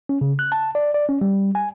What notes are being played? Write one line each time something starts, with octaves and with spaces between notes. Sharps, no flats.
C#4
C#3
F#6
A5
D5
D5
C#4
G3
G#5